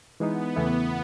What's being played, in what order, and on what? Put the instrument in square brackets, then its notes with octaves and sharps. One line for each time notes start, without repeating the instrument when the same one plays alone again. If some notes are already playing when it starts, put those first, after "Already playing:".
[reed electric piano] E3 G#3 D#4 [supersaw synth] B3
[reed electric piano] E2 C#3 E3 A3 E4